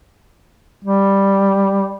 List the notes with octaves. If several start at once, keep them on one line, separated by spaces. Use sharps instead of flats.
G3